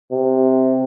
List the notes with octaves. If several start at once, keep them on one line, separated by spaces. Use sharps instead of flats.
C3